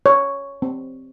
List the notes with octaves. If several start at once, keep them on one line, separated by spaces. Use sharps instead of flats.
C#5
C4